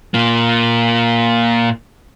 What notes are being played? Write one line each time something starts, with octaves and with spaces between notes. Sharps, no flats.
A#2 A#3